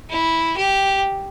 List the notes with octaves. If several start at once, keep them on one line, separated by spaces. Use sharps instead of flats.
E4
G4